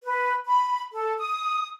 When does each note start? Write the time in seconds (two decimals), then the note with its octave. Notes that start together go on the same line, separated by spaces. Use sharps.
0.03 B4
0.46 B5
0.93 A4
1.18 D#6